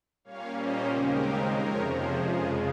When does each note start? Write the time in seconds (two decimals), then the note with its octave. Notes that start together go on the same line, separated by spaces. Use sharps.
0.24 A#2 G3 A#3 C#4 C#5 F5
0.57 C5 D#5
0.90 D#2 C#3 G#3 C4 D#4 G4 A#4
1.55 F2 C3 F3 A#4 C#5
1.88 G#4 C5
2.21 F2 C#3 G#3 F4 G#4